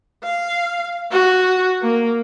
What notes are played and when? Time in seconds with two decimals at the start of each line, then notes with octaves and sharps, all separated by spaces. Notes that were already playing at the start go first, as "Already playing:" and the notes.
0.23 F5
1.11 F#4
1.82 A#3